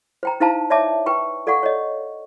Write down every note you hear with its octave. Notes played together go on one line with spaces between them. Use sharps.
C5 G5 A#5
D#4 E4 C5 F5 A5 A#5
C#5 D5 E5 A5 D6
B4 G5 C#6
A4 D5 F5 F#5 C#6
C#5 D#5